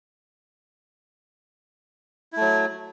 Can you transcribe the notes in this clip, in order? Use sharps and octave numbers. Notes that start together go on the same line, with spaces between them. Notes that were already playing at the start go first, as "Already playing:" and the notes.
F#3 A3 E4